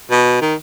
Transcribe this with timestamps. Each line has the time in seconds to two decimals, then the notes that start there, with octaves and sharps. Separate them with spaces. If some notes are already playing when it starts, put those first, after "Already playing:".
0.11 B2
0.41 D#3